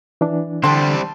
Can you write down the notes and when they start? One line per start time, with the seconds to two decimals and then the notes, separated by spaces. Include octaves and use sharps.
0.21 E3 D4
0.64 D3 G3 C4 A5 C6